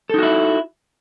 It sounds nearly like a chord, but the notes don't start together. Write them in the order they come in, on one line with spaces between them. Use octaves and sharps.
A4 D#4 F#4 E4